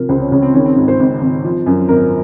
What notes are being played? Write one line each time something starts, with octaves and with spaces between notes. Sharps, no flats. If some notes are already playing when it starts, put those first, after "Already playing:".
Already playing: C3 F3 A#4
C#2 C5
C#4
C#2 C#4
C4
D#3 C#4
C4
G#2
C5
G#1
G#1
F3
F#2
G#1 A#4